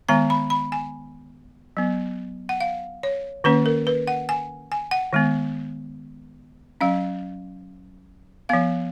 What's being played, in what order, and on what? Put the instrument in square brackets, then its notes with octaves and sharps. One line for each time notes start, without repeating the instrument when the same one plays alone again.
[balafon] D#3 G#3 B3 A#5
B5
B5
G#5
F#3 B3
F#5
F5
C#5
D#3 A#3 C#4 B4
A#4
B4
F#5
G#5
G#5
F#5
D#3 G#3 B3
F#3 C#4 F5
F3 B3 F5